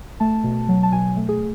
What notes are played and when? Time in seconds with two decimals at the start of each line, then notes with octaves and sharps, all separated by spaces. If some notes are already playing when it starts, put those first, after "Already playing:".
0.20 A3 A5
0.44 B2
0.69 F#3
0.83 A5
0.92 B2 G#5
1.17 A3
1.29 G#4